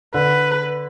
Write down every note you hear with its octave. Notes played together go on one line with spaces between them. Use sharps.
D3 B4